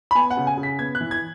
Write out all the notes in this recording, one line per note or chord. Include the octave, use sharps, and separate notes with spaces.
B5
B3 G#5
F#5
C#3
G#5
C#3
B6
B3 G#6
F#6
E3
G#6